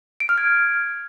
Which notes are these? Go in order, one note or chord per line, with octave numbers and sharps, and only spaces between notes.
D7
F6
G#6